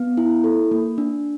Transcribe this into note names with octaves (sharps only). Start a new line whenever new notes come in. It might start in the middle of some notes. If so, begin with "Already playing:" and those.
Already playing: B3
E4
A4
A#3
D4